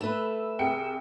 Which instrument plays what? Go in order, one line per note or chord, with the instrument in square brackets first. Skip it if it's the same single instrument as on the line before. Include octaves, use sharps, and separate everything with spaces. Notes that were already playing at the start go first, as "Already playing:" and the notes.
[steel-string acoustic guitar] A3 B4 [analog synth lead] E6
[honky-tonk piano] C2 G5 C#7 [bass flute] G#4